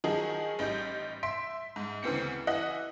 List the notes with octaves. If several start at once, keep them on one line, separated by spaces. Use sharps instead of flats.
D#3 F3 F#3 D#4 G#4
A1 G3 D#4 G6
E5 C6 B6 D7
G#2
D2 C#3 E3 B3 C4 C#7
E3 D#5 E5 F#5 F#6